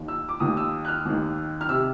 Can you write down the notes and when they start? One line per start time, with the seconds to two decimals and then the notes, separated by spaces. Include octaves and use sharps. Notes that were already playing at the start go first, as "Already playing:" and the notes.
Already playing: D#2 D#3
0.08 E6
0.29 D6
0.40 D#2 D#3 D#6
0.57 E6
0.85 F#6
0.88 F6
1.05 D#2 D#3
1.61 F6
1.69 C3 E6